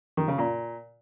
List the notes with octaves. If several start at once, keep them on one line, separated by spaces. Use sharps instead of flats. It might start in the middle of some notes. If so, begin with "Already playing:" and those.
D#3
C#3
A#2